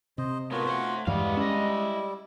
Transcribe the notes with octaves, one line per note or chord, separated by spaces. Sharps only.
C3 C5 D#5
A2 B3 F4 F#4 A#4 C#5
A3 C5 F#5
E2 G2 E3 G3 G#3 B3 F5
C#4 E4 D#5